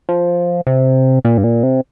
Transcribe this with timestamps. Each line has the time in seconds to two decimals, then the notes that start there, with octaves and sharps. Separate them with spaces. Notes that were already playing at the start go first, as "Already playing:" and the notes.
0.09 F3
0.67 C3
1.25 A#2
1.38 G2
1.44 A#2
1.63 C3